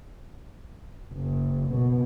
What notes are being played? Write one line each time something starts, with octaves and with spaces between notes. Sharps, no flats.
F#1
B2